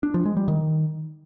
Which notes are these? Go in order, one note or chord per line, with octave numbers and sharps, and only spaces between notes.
D4
F3
G#3
G3
D#3